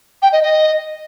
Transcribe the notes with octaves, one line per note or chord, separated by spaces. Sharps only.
G5
D#5
D#5